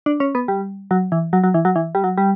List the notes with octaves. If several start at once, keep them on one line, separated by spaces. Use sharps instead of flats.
D4
C#4
B3
G3
F#3
E3
F#3
F#3
E3
F#3
E3
G3
F#3
G3